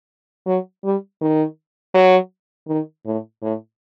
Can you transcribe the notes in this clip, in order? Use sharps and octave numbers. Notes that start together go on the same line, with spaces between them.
F#3
G3
D#3
F#3
D#3
A2
A2